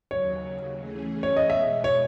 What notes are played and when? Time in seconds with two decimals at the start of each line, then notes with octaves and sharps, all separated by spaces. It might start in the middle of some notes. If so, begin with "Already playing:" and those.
0.11 D#2 C#3 F#3 C#5
0.80 E3 A3 C#4 G#4
1.23 C#5
1.36 D#5
1.50 B2 G#3 B3 E5
1.84 C#5